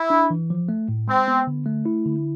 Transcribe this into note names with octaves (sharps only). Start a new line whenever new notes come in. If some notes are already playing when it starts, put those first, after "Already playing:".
Already playing: E4
D4
E3
F3
A3
A2
G#3 C4
B3
D3
A3
E4
D3